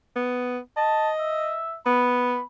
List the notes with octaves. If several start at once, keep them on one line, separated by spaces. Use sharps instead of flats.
B3
D#5 A5
E5
B3 B5